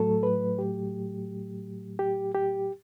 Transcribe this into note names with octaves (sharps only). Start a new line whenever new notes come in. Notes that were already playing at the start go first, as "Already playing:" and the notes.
Already playing: A2 F#3 A3 A4
B4
G4
G4
G4